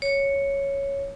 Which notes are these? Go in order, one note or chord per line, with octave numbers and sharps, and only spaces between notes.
C#5